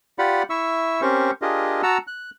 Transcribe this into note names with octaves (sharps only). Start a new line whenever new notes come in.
F4 G4 D5 F#5 B5
E4 E5 C#6 E6
C4 C#4 G4 A#4 C5 C#6
D4 F4 G4 G#4 A#4 D#5
F#4 F#5 A5 A#5 E6
F#6